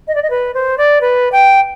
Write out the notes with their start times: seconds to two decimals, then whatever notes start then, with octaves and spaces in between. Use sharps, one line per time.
0.07 D#5
0.15 D5
0.22 D#5
0.30 B4
0.54 C5
0.77 D5
1.01 B4
1.32 G5